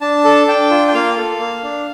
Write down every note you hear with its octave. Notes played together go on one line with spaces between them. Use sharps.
D4 A5
A4
D4 G5
F4
G5
A#3 F5
A4
A#3
D4